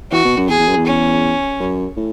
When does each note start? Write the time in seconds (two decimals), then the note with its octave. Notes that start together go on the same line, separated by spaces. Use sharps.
0.12 E3 F#4
0.24 B2
0.37 F#2
0.49 E2 G#4
0.59 E2
0.68 F#2
0.77 E2
0.86 C#4
1.60 F#2
1.97 A2